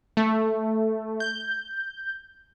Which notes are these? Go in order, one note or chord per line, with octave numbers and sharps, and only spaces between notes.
A3
G6